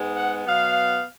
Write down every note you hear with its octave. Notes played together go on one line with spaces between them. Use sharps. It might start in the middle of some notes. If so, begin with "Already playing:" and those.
Already playing: G#2 G#3 B3
F#5
B2 F#3 B3 F5